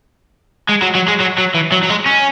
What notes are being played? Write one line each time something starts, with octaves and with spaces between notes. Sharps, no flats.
G#3
F#3
F#3
G#3
F#3
F#3
E3
F#3
F#3
G#3
C#4